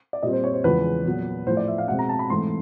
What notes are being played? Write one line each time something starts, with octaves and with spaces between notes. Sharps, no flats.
D5
A#2 G3 C4 D#5
C5
C#5
C5
E2 C#3 F3 G#3 B4
A#2 F#3 B3
A2 F3 A3 C5
D5
E5
F5
B2 G#3 C4 F#5
A#5
A5
B5
G#2 E3 A3 C4 C6